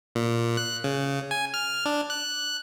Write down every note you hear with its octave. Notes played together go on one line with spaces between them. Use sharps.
A#2
F#6
C#3
G#5
F6
D4
F#6